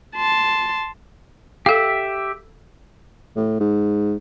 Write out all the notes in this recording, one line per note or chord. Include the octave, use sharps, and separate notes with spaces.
A5 C6
G4 A4 E5 F5
A2
G#2